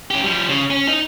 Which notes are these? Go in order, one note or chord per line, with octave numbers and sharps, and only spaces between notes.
C#4 G4
F3 G3
C#3
C#4
D#4